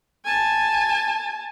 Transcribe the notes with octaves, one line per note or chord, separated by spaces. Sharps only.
G#5 A5